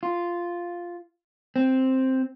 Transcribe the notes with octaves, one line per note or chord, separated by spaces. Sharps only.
F4
C4